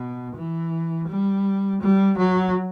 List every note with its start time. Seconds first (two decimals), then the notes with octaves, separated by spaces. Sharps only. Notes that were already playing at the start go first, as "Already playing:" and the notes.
Already playing: B2
0.35 E3
1.08 G3
1.81 G3
2.17 F#3